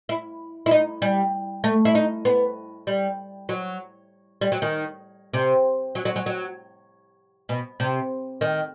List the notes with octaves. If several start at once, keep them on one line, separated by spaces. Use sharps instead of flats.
E4
E4
D#4
G3
A3
E4
D#4
B3
G3
F#3
G3
F#3
D#3
C3
F#3
F#3
F#3
F#3
B2
C3
D#3